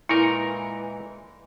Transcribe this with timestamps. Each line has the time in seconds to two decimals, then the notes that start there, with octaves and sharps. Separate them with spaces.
0.09 A#2 E3 G#3 D#4 E4 A#4